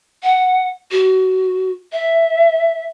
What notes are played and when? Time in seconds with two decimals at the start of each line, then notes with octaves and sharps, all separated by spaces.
0.23 F#5
0.91 F#4
1.92 E5